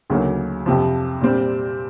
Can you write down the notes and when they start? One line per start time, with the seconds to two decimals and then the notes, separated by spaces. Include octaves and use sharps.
0.10 D2 C#3 F#3 A#3 D#4
0.66 F2 C3 F3
1.21 A#2 G3 C4